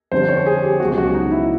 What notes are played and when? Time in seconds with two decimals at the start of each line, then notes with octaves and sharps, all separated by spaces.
0.11 F2 D3 G3 C5
0.29 C#5
0.46 G#4
0.63 G4
0.80 C#2 B2 F#3 F#4
0.98 F#4
1.14 D#4
1.32 E4